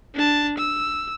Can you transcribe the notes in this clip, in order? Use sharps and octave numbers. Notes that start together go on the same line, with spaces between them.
D4 A5
E6